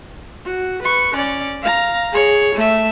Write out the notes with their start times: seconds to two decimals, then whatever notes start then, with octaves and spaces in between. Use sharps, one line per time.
0.45 F#4
0.83 B4 C#6
1.15 C#4 D5
1.63 F5 A#5
2.12 G#4 C#5
2.55 A3 E5